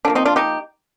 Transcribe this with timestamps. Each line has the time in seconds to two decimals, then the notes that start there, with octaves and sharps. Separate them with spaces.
0.05 D3 D4
0.08 F3 A#3
0.15 C4 D#4
0.25 D4 F4
0.36 D#4 G4